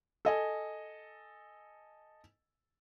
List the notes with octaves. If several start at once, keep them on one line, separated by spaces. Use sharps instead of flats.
A4 D#5 G#5